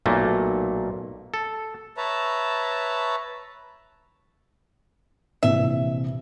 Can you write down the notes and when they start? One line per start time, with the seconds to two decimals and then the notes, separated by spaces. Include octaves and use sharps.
0.06 B1 A#2 A3 A#3
1.34 A4
1.97 B4 C#5 E5 A5 A#5
5.43 A#1 C3 E3 E5